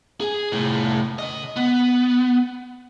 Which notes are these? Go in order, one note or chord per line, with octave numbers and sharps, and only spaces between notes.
G#4
C2 A2
C#3 D#5
B3